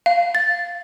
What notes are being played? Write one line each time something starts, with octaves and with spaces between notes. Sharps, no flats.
F5
A6